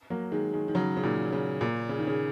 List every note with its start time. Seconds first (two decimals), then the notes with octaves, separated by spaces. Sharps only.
0.10 F#3 A#3
0.32 D#3 G#3
0.53 D#3 G#3
0.68 D#3
0.75 C#3 F#3
0.97 C#3
1.03 A#2 D#3
1.32 C#3
1.61 A#2
1.89 C#3
1.99 D#3
2.07 C#3